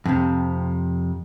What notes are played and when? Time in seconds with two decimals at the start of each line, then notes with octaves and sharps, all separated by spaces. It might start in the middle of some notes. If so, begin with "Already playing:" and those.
0.06 F2 C3